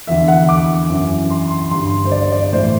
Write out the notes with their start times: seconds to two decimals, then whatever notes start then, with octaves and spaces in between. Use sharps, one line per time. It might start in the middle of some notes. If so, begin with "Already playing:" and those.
0.07 E2 D3 E5
0.28 F#5
0.49 D6
0.90 F#2 E3
1.30 C6
1.51 C6
1.71 G2 D3 C6
2.05 C5
2.12 D5
2.32 D5
2.53 A2 E3 C5